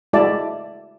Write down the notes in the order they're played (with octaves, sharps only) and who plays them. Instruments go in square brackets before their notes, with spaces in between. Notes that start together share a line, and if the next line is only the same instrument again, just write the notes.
[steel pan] G#3 E4 F#4 D5 A5